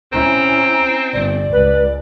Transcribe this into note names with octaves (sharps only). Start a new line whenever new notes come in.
C4 C#4 E4 A#5
G1 D5
C#2 B4